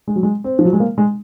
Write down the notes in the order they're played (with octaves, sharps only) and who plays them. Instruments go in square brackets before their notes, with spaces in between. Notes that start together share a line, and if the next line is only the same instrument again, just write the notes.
[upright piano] G#3
F#3
G#3
C4
F3
F#3
G#3
A#3
G#3